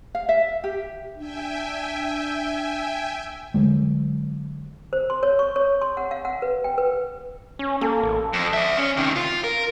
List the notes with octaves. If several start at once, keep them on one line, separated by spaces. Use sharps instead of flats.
F5
E5
G4
D4 E5 G5 G#5
D3 F#3 G#3
C5
C6
C#5
C#6
C#5
C6
F#5
F5
F#5
B4
G5
B4
C#4
A#3 A4
A1
F2
D5 E5
C#4
C3 D#3
F4
A#4